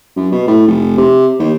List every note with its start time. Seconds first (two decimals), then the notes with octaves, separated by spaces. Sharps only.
0.16 F#2
0.32 B2
0.47 A2
0.67 F1
0.97 C3
1.39 D#2